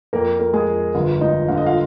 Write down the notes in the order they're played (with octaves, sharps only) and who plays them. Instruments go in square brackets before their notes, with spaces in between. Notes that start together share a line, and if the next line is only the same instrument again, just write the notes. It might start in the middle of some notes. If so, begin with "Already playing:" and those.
[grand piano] F2 A#3 A#4
A#3
G#3 G#4
F2
G1 F4
G#3 D#4 D#5
D3 F5
D#5
F4 F5